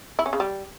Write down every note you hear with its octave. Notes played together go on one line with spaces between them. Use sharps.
E4
C#4
C#3
G3